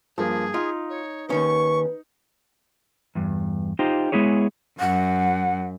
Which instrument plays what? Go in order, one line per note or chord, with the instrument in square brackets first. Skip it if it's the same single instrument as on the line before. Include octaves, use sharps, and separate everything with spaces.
[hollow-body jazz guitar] G2 [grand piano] F3 A#3 [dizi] G#4
[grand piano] D#4 [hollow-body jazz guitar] F4
[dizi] C#5
[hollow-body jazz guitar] D#2 D#3 C#4 [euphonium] B4 [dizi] C#6
[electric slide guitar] E2 G2
D#4 F4 G4 C5
G#3 B3 E4 G#4 C#5
[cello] F#2 [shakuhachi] F#5